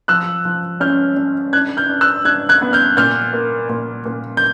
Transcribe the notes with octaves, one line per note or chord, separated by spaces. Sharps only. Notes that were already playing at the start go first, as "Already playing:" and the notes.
F3 E6 F#6
F3
C#4 F6 G6
C#4
D4 F#6 G#6
F6 G6
D4
E6 F#6
D4 F#6 G#6
F#6 G#6
B3
F6 G6
A#2 F6 G6
A#3
A#2
A#2
G6